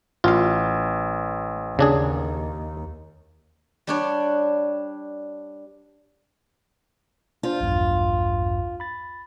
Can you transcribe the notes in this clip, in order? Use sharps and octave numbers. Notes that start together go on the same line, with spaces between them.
A1 F4 F5
D#2 C#3 D4 G#4
G3 D4 C#5
D4 F4 C5
A#1 E2 G2
B5 A6